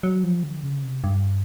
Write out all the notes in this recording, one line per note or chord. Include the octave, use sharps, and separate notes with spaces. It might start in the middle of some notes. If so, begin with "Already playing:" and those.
F#3
F3
D3
C#3
C3
G2